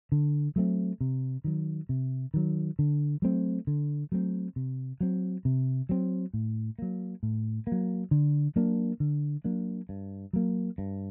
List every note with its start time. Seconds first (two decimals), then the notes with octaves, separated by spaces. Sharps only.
0.12 D3
0.56 F#3 A3 C4
1.01 C3
1.44 D#3 F#3
1.89 C3
2.34 D#3 F#3
2.79 D3
3.22 F#3 A3 C4
3.67 D3
4.12 F#3 A3 C4
4.56 C3
5.01 F#3 C4
5.45 C3
5.89 F#3 C4
6.34 A2
6.79 F#3 A#3
7.23 A2
7.67 F#3 A#3
8.11 D3
8.56 F#3 A#3 D4
9.00 D3
9.44 F#3 A#3 D4
9.89 G2
10.33 F#3 A#3
10.78 G2